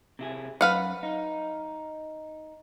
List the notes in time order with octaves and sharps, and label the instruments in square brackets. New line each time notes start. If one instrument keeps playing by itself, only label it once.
[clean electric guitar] C3 E4 G#4
[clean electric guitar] F#2 [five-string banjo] B4 F5 F#5
[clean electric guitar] D#4